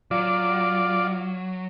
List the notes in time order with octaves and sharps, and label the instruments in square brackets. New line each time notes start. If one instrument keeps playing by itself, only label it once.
[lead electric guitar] F#3 [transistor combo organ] F4 D5